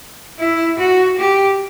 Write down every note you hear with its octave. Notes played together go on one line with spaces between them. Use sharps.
E4
F#4
G4